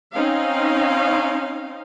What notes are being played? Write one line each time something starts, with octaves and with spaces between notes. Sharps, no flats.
C4 C#4 D#4 F5